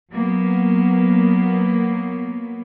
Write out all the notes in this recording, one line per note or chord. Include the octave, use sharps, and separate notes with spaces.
F#3 A#3 B3